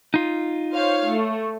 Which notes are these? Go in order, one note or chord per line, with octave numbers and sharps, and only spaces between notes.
D#4 F4
C5 C#5 F5
A3